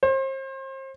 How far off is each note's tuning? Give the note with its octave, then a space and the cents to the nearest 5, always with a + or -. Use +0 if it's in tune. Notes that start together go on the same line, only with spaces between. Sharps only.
C5 +35